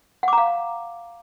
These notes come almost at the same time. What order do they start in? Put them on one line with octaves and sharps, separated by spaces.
F#5 D6 A#5 F5